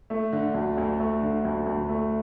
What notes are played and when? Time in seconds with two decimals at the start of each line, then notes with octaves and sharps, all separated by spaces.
0.10 A3
0.32 D3
0.54 D2
0.78 D2
1.00 A3
1.23 D3
1.45 D2
1.66 D2
1.89 A3